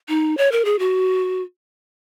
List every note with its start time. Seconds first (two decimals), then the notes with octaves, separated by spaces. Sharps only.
0.09 D#4
0.37 C#5
0.52 A#4
0.65 G#4
0.79 F#4